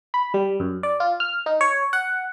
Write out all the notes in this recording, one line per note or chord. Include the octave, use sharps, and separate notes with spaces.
B5
G3
F#2
D5
F4
F6
D#4
C#5
F#5